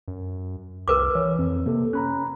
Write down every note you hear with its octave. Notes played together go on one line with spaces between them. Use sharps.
F#2
C2 A#4 B4 D6
E3 C#5
F2 C4
C3 A#3 A4
C#4 A#5 B5 F#6